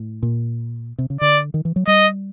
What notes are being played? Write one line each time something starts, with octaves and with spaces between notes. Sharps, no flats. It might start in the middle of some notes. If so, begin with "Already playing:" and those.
Already playing: A2
A#2
C3
C#3
D3 D5
D#3
E3
F#3
G3 D#5